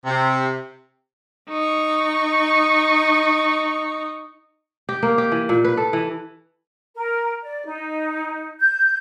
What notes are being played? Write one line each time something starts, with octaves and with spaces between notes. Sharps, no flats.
C3
D#4 C#6
G4
A#3
G4
E3
A#2
B4
A4
E3
A#4
D5
D#4
G6